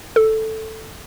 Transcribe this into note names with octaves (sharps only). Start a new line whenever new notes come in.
A4